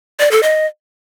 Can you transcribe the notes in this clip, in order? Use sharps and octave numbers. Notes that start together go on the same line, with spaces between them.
D5
A4
D#5